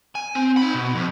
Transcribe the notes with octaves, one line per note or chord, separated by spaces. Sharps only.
G#5
C4
D#4 B5
B2
F2